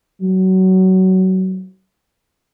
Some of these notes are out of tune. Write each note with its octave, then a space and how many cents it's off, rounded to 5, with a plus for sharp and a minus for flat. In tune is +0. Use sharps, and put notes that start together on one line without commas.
F#3 +20